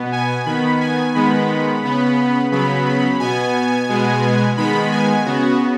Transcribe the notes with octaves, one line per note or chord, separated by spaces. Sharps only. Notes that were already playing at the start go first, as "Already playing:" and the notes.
Already playing: B2 B3
G#5
D#3 B3 B5
G#5
D#3 G#3 B3 B5
C#3 B3
C#3 F#3 B3 B5
B5
B2 B3 G#5
B2 G#3 B3
D#3 G#3 B3 B5
G#5
C#3 B3 F#4